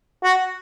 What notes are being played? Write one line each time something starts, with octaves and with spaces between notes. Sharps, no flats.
F#4